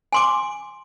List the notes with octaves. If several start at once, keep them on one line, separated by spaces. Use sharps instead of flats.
G#5 C6 D6